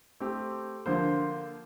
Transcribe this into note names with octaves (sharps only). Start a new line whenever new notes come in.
A3 C4 G4
D3 F3 A#3 F4 C5